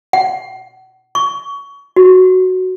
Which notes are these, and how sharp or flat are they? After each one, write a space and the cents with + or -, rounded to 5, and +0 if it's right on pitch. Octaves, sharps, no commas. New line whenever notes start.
F#5 +30
C#6 +20
F#4 +0